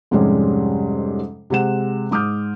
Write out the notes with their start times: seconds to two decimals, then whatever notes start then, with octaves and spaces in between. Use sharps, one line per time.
0.11 F2 G#2 C3 G3 G#3 C#4
1.50 C3 G#3 F#5 E7
2.11 G#2 D6 D#6 F6 G6